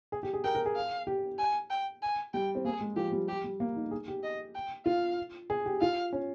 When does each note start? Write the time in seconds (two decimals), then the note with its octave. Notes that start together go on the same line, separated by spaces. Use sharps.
0.12 G#4
0.23 G4
0.33 G#4
0.44 A#4 G5
0.55 A#4
0.66 G#4
0.76 F5
1.07 G4
1.38 G#5
1.70 G5
2.02 G#5
2.34 G3 G5
2.55 C4
2.65 A#3 G#4
2.81 G#3
2.96 F3 G4
3.12 G3
3.28 G4
3.44 G3
3.60 A#3
3.76 D#4
3.91 G#4
4.08 G4
4.23 D#5
4.55 G5
4.86 F4 F5
5.50 G#4
5.66 G4
5.81 F4 F5
6.13 C#4